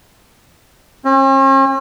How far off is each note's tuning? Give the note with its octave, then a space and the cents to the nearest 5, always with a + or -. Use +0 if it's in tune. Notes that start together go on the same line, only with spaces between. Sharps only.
C#4 -45